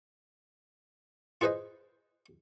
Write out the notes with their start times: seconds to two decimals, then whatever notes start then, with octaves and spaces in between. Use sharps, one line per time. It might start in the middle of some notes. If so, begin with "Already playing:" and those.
1.41 F4 G#4 B4 C5 D#5